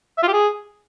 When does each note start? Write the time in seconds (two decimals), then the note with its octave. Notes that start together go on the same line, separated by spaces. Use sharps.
0.18 E5
0.23 F4
0.28 G4
0.33 G#4